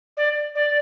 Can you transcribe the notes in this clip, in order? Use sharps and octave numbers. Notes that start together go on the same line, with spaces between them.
D5
D5